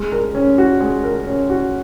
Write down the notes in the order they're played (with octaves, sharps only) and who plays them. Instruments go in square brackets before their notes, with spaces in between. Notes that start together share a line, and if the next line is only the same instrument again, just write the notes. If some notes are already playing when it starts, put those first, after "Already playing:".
Already playing: [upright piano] G#3
A#4
C#4
F#4
G#3
A#4
C#4
F#4